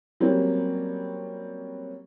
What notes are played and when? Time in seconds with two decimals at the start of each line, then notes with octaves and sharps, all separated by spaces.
0.20 F#3 G3 A#3 C4 C#4